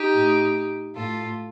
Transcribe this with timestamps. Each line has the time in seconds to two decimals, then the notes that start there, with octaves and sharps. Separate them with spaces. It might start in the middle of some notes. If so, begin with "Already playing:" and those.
Already playing: D#4 G4
0.11 A2
0.95 A2 F4 A4